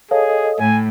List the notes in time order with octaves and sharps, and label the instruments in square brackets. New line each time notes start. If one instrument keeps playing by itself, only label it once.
[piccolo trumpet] G#4 [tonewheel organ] A4 D#5 [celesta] C#5 F5
[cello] A2 [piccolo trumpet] G#5